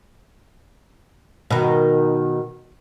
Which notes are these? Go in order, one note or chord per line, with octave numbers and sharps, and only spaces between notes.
B2 D#3